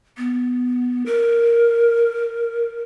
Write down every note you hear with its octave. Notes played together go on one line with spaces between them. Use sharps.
B3
A#4